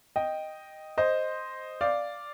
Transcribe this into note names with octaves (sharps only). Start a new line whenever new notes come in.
D#5 G5
C5 D#5
D5 F5